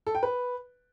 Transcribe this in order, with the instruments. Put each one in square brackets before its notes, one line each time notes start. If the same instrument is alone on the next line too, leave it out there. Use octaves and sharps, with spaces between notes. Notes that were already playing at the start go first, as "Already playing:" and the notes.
[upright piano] A4
G5
B4